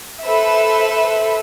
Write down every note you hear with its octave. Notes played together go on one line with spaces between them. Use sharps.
A4 B4 C5 E5